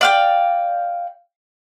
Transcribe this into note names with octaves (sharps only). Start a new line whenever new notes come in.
D5 F5 G5